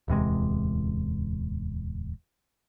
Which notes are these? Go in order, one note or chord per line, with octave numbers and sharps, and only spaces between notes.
D1 E2 C3 G#3